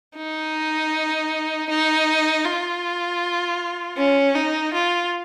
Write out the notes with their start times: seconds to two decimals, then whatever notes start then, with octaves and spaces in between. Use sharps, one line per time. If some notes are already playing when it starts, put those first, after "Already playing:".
0.16 D#4
1.69 D#4
2.45 F4
3.97 C#4
4.35 D#4
4.74 F4